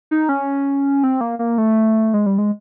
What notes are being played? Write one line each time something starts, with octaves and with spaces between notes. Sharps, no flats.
D#4
C#4
C4
A#3
A#3
A3
G#3
G3
G#3